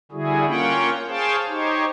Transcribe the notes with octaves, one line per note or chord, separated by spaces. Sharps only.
D3 G3 E4 F#4 G#4
A#3 C#4 F4 C#5 F#5 G5
G#4 C5 C#5 F5 G5 A5
D#4 G4 C5 C#5